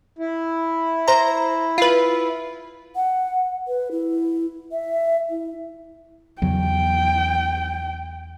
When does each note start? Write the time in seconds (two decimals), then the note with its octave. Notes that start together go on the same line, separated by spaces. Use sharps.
0.19 E4
1.08 C5 A#5
1.78 F4 B4
2.96 F#5
3.67 B4
3.91 E4
4.72 E5
5.30 E4
6.42 E2 C#3 F#3 G5